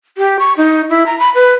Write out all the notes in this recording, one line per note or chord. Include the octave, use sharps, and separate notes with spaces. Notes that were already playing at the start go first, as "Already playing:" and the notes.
G4
C#6
D#4
E4
A#5
B5
B4